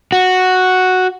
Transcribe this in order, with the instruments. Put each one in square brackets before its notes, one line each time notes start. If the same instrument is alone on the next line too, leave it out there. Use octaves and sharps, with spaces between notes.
[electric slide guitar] F#4